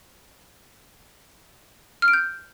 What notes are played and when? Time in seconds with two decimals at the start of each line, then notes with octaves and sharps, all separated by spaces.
2.02 F6
2.08 D7
2.13 G6